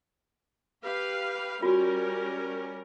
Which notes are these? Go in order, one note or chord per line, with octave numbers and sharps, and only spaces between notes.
G4 B4 F5
G3 C#4 F4 F#4 A#4